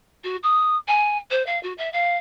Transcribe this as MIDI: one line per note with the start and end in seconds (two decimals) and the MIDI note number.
0.24 0.37 66
0.43 0.76 87
0.88 1.18 80
1.31 1.45 72
1.46 1.61 77
1.63 1.73 66
1.78 1.91 76
1.93 2.17 77